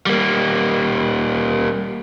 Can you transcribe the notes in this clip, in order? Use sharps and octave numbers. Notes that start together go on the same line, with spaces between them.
G3 A#3